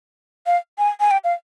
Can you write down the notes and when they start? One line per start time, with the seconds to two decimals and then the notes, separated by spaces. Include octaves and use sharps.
0.46 F5
0.78 G#5
1.00 G#5
1.11 G5
1.24 F5